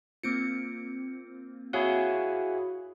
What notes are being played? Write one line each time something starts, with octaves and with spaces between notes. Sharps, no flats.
A#3 C4 F4 C#7 D7
E4 F#4 G#4 C#5 F5 F#5